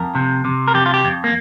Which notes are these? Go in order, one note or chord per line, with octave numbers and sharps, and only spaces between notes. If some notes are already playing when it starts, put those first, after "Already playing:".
Already playing: F2 A#4
C3
C3
A#4
F2 G4
F4
G4
F2
A#3